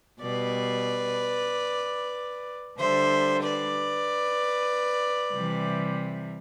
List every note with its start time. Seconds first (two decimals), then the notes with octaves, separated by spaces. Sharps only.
0.22 B2 G3 B4 D5
2.79 D3 G3 C5 E5
3.43 B4 D5
5.35 C3 E3 G3